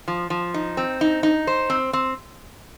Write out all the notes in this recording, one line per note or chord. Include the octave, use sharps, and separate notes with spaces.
F3
F3
D#4
C4
D#4
D#4
C5
C4
C4